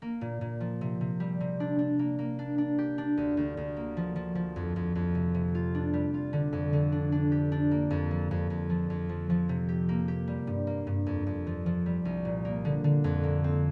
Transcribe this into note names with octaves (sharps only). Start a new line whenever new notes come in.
A#3
A#2
A#2
F3
C3
C3
G3
C3
D4
D4
A#3
A#3
D4
D4
G4
D4
D2
D2
D2
A#3
F3
F3
F3
F2
F2
F2
C3
C3
F4
D4
G3
F4
D3
F2
D3
D4
D4
G4
D4
A#3
F2
F3
F2
F2
F3
F2
F3
F3
C3
G4
A#3
G4
G3
G2
A#3
G2
F2
F2
F3
F3
G3
C2
A#2
A#3
D3
D3
F2
A#3
C4